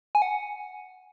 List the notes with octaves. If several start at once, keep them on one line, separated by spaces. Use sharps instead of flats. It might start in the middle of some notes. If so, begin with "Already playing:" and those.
G#5
F#5